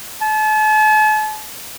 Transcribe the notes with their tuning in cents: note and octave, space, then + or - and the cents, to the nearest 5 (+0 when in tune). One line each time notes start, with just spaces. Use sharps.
A5 -40